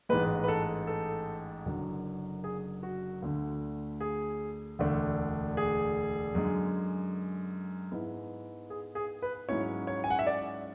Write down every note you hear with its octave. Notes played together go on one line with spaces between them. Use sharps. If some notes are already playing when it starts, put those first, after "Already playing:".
A1 G#2 G#3 B4
B4
A4
A4
F#1 F#2 D3 F#3
G#4
F#4
D2 D3 A3
G#4
E1 D2 D3 A3 D4
G#4
F#2 D3 G#3
G#2 G#3 B3 E4
G#4
G#4
B4
G#2 F#3 C#4 E4 C#5
C#5
G#5
F#5
E5
D5